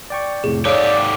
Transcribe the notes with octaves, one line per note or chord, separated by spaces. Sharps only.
D5 G5 C#6
F2 A2 C3 G#4
G#2 G4 A4 C#5 D5 F5 D#6 D7